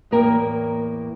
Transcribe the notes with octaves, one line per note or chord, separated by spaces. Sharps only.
E2 A2 A#3 A#4 G5